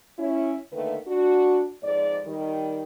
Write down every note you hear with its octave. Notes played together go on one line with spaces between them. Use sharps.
C#4 E4
D3 D#3 A3 A#3 B4
D4 F#4
F2 G#2 D5
D#3 G3